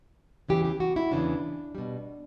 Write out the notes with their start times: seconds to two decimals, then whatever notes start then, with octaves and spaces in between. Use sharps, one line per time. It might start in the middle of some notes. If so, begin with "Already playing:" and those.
0.49 E2 C#3 E3 G4
0.65 G4
0.80 F#4
0.96 E4
1.11 E2 C#3 E3 D4
1.75 B2 G3